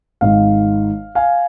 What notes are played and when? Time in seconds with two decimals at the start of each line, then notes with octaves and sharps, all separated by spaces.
0.21 G#1 G#2 D#3 F5
1.15 F5 G#5